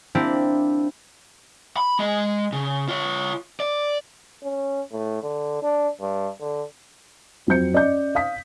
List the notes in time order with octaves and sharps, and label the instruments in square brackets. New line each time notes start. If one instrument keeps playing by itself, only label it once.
[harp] A#3 C4 D4 E4 G4
[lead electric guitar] B5
G#3 D#5
C#3
F4 C#5
D5
[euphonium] C#4
A2
D3
D4
G2
D3
[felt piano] F2 F#3 C4 G6 C#7
C#4 D5 D#5 G6
F5 D#6 B6